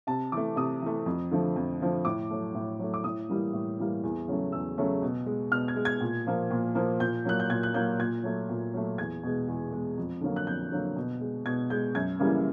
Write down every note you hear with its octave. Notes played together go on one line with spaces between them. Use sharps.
C3 A5
E3 A3 D6
C3 D#6
E3 A3
F2
D3 F3 A3
F2
D3 F3 A3
A2 D6
F#3 A3
A2
F#3 A3
D6
A2 D#6
E3 G3 A#3
A2
E3 G3 A#3
E2
C#3 F#3 A3
E2 E6
C#3 F#3 A3
B2
G#3
B2 F6
G#6
G#3
G#6
A#2
F3 A#3
A#2
F3 A#3
A#2 G6
F#3 A#3 F#6
G6
A#2 G#6
F#6
F#3 A#3 G6
A#2 G#6
F#3 A3
A#2
F#3 A3
E2 G#6
B2 G#3
E2
B2 G#3
F2
D3 F#3 A#3
F#6
F2 G6
D3 F#3 A#3
B2
G#3
B2 G#6
G#3 G6
F#2 G#6
C#3 E3 G3 A#3